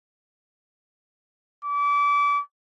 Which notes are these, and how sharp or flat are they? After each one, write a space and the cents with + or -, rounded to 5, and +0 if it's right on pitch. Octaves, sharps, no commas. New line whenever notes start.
D6 -30